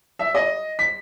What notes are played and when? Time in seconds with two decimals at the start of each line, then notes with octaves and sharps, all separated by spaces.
0.19 E5
0.35 D#5
0.79 B6